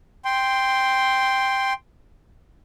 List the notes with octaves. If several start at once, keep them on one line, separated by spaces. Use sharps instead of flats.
G5 C6